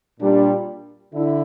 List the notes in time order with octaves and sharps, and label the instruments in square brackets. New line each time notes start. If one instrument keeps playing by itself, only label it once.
[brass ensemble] A#2 G3 D4
D3 E4